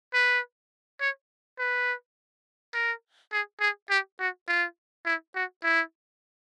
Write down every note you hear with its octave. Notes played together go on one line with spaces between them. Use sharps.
B4
C#5
B4
A#4
G#4
G#4
G4
F#4
F4
E4
F#4
E4